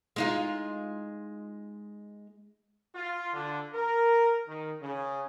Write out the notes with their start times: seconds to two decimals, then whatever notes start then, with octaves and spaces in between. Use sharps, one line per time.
0.16 G#3 D#4 F4
2.94 F4
3.34 D3
3.74 A#4
4.47 D#3
4.81 C#3